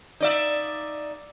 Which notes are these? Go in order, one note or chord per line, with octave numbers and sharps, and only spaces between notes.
D#4 D5 E5